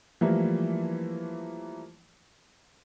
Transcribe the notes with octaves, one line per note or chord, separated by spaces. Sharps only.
E3 F3 G3 A3 A#3 E4